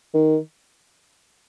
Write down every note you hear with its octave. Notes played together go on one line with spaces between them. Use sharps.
D#3